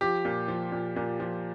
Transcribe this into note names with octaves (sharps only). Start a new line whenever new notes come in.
F3 G4
A#2
F3
A#2
A#2
F3